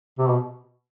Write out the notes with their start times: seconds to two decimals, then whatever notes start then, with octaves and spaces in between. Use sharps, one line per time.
0.19 C3
0.28 B2